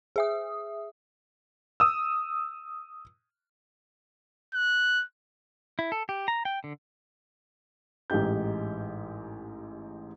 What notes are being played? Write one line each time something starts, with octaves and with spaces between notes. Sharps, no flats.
G#4 E5 D#6
D#6 E6
F#6
E4
A4
G4
A#5
G5
D3
A1 G#2 D#4 G4 G6